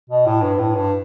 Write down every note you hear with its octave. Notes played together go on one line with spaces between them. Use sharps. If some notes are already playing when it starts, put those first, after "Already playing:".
B2
A2
G2
A2
G2